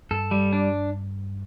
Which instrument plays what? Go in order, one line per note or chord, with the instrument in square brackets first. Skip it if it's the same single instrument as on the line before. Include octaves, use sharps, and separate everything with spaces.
[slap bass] G2 [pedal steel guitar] A4
[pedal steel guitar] G3
D4